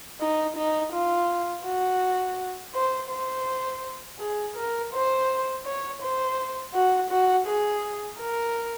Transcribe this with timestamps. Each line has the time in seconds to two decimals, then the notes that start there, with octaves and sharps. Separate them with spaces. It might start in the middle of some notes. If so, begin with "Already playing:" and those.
0.20 D#4
0.57 D#4
0.93 F4
1.65 F#4
2.74 C5
3.10 C5
4.19 G#4
4.56 A#4
4.93 C5
5.66 C#5
6.02 C5
6.74 F#4
7.10 F#4
7.46 G#4
8.19 A#4